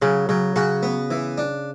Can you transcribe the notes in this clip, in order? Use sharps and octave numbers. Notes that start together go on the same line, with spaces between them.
C#3 F#3
C#3 F#3
C#3 F#4
B3
E3
D4